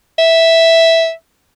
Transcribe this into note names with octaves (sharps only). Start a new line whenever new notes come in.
E5